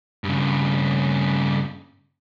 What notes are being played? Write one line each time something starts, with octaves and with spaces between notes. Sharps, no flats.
G2 C#3